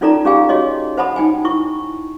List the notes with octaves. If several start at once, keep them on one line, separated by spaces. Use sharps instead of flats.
C#4 D#4 F4 A4 D5 A#5
C#4 G4 G#4 F5 G5 G#5
F#4 G#4 C#5 D#5
C5 F#5 A5 B5 D#6
D#4 G5 G#5
E4 C#6